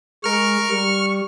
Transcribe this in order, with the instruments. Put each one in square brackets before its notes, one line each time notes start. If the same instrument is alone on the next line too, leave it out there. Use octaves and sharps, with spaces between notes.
[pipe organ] G#3 [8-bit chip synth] A#4 F6 [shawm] C#6
[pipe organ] G3 [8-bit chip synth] F6